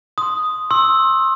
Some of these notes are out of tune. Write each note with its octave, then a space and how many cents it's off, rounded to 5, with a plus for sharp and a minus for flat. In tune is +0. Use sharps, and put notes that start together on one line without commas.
C6 +0 D#6 +0
C6 +30 E6 +0